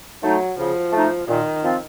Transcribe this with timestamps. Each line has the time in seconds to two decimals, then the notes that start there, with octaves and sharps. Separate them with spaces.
0.23 F#3 A3 D#4
0.58 C#3 F3
0.93 A3 D#4
1.28 A#2 D#3
1.63 F3 C4 F4